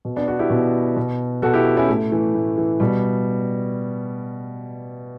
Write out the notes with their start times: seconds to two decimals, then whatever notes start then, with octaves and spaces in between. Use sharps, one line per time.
0.05 B2
0.16 B3 D4
0.27 D4 F#4
0.39 E4 G4
0.50 B2
0.96 B2
1.42 B2 F#4 A4
1.53 E4 G4
1.77 C#4 E4
1.89 A2 A3
2.12 E3
2.35 A2
2.58 E3
2.80 B2 G3